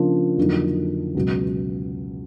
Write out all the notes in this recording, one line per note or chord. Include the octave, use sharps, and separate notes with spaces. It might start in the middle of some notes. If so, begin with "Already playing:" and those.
Already playing: C#3 F3 A#3 D4 F4
F2 D3 F#3 A#3 D#4
C#2 B2 F#3